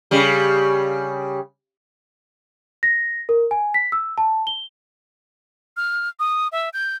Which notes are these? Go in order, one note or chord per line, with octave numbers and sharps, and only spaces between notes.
C#3 G3
A#6
A#4
G#5
B6
E6
A5
G7
F6
D#6
E5
G6